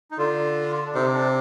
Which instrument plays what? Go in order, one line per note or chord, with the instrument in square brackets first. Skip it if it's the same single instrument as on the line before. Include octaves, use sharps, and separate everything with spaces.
[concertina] D#4
[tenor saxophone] D3 [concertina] F4
[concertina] D4
[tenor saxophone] C3 [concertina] D#4
[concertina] D4